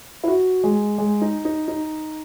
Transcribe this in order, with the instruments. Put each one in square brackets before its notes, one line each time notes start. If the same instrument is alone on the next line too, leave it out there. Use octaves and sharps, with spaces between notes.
[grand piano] E4
F#4
G#3
G#3
D#4
D#4
D#4